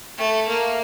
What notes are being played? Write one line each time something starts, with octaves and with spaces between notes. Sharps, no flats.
A3
A#3